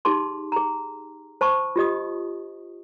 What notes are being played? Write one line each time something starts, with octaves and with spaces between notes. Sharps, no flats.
D#4 G4 G#4 A5 C6
G#4 A#5
C5 A5 B5 C#6
F4 G4 D#5 D#6